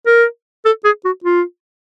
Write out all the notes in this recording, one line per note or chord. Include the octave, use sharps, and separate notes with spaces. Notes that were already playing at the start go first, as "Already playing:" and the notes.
A#4
A4
G#4
F#4
F4